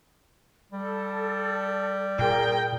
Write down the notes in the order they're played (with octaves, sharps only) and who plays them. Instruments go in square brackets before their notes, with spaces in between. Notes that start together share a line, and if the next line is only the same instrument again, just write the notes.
[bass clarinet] G3 [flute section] A4
[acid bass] A#2 [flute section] G#4 A#4 [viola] G5